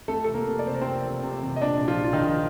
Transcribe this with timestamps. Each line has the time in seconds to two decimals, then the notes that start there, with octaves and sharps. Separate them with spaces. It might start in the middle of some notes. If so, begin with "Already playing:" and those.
0.08 F2 A3 A4
0.24 F1 A4
0.34 A#3 A#4
0.47 C3
0.59 D5
0.65 F1 C5
0.74 A#4
0.81 F2 C4 C5
1.04 F1
1.23 C3
1.43 F1
1.56 D#5
1.62 A#2 D4 D5
1.81 A#1
1.88 F3 F4
2.00 F3 F4
2.13 D#3 D#4
2.20 A#1